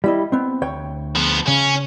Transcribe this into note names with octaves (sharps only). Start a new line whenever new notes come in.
G3 E4 D#5
B3 C4
D2 C#5 G5
F3 B3
C#3 C#4